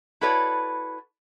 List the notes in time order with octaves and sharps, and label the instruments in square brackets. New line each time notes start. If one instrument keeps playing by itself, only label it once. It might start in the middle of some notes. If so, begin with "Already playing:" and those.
[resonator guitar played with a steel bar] E4 F#4 A4 B4 C#5 D5